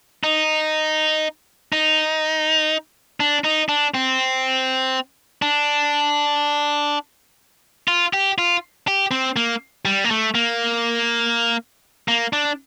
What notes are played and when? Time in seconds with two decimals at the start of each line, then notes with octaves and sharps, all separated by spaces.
0.24 D#4
1.73 D#4
3.20 D4
3.44 D#4
3.69 D4
3.94 C4
5.42 D4
7.88 F4
8.13 G4
8.38 F4
8.88 G4
9.11 C4
9.36 A#3
9.85 G3
10.04 A#3
10.11 A3
10.35 A#3
12.08 A#3
12.33 D4